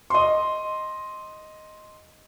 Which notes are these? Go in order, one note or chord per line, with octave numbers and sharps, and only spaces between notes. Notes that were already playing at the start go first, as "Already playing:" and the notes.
D#5 C6